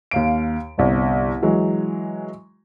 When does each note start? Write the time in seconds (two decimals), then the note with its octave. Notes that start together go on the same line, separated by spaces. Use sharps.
0.11 D#2 F5 D7
0.78 G1 C2
1.42 E3 F#3 G#3